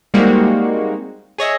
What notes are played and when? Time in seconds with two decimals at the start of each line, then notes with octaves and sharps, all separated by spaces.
0.14 G3 G#3 A#3 C4 D#4 F#4
1.38 G#4 C#5 D#5 E5